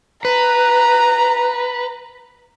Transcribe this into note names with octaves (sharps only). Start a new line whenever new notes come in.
B4 A#5